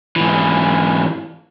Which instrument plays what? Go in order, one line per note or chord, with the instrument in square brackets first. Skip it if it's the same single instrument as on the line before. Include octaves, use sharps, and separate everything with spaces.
[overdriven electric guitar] G#2 E3